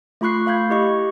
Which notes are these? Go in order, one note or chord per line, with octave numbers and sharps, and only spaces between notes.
A3 F4 B5 C#6 F#6 C7
A3 F5 B5 G6 G#6
E4 G4 D#5 C#6